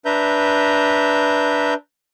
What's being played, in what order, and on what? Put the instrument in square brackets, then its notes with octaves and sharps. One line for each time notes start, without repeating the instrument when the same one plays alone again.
[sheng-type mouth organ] D4 B4 E5 A#5 G6